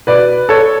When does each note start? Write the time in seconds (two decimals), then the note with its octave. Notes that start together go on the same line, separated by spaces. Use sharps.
0.07 B2 B4 D5
0.49 A4 C#5